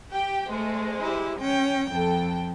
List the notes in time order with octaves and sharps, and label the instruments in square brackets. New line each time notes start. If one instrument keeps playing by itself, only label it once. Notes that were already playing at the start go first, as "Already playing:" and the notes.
[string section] G4 G5
[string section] G#3 C5 [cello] A3
[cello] E4 G4
C#4 G5
[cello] F2 [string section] A4 G5